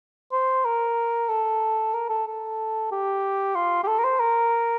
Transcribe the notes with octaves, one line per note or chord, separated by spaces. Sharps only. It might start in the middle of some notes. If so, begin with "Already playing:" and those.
C5
A#4
A4
A#4
A4
A4
G4
F4
G4
A4
A#4
C5
A#4